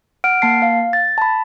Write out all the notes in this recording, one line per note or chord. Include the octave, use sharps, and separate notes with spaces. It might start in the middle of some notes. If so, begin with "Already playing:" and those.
F#5 F6 D7
A#3 A5 C7
F5
A6
A5 B5